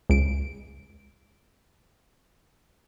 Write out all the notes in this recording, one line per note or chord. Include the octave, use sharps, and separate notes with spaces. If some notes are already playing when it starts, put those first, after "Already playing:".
C#2 D7